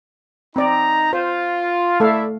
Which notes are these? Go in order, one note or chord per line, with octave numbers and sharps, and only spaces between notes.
C4 D#4 D5 A#5
F4 C5
A3 E4 A4 D5 E5 F5